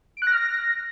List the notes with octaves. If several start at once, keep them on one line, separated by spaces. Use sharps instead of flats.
D7
F#6
A#6
F6
A#6